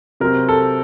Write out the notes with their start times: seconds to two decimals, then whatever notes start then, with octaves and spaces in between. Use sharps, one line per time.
0.20 C3 F#3 C4 A#4
0.49 A4